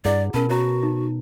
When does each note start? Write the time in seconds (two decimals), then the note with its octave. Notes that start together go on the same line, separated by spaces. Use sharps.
0.05 G2 E4 G#4 D5 F#5
0.34 B2 C#4 A#4 A5 B5
0.49 C#4 F#4 C#5 A#5
0.83 D#4